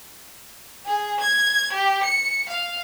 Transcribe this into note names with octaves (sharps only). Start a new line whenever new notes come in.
G#4
G#6
G4
C#7
F5